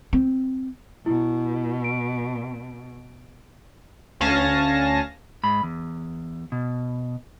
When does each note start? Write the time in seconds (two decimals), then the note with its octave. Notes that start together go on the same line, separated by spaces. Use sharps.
0.13 C4
1.06 B2 E4
1.84 D7
4.20 D2 C#4 F5 G#5 A5 A#6
5.43 G#2 B5
5.63 E2
6.52 B2